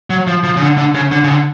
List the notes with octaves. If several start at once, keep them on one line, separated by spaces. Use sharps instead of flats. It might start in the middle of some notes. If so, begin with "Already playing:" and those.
F#3
F3
F3
C#3
D3
D3
C#3
D3
C#3
D3